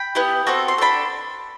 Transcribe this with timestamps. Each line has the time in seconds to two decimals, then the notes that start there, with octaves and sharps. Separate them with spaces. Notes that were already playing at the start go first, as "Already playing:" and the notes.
Already playing: G5 B5
0.15 B3 E4 G4
0.47 C4 F#4 A4
0.68 C6
0.78 D4 A4 B5